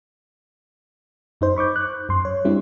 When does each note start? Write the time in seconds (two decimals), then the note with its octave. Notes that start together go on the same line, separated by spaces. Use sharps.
1.41 F#2 D#4 C5
1.56 B5 C#6 D6 G6
1.76 F#6
2.09 F#2 C6
2.25 C#5
2.45 G3 C4 D4 E4